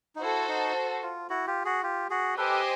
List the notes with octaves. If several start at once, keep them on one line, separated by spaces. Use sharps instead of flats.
D#4
E4 F#4 A4 C5
D#4
F4
E4 F#4
F4 G4
F#4 G#4
F4 G4
F#4 G#4
G4 A4 B4 C5 D#5 G#5